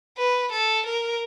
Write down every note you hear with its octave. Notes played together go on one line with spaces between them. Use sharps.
B4
A4
A#4